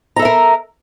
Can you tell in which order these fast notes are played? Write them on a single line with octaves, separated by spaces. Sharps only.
A#5 A4 E5 A#4